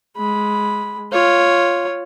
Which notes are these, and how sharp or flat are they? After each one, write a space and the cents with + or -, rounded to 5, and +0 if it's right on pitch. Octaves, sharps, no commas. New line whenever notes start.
G#3 +5 B5 -5
F4 +0 C#5 +0